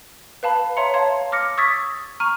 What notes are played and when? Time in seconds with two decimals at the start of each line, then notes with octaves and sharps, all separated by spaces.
0.43 B4 F5 A5 B5
0.77 C#5 E5 A#5 C6 C#7
0.94 C#5 F5 A5 C6 G#6
1.32 D6 F6 A#6 C#7
1.57 C#6 D#6 E6 G#6 A6 B6
2.20 A#5 C#6 F6 D#7